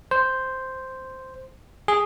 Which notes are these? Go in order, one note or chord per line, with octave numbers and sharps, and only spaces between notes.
C5
G#4